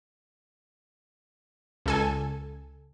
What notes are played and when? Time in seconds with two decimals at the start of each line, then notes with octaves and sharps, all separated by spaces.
1.86 C#2 A4 G#5